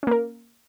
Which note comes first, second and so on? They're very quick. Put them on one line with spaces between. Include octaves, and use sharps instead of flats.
C#4 A#3 A#4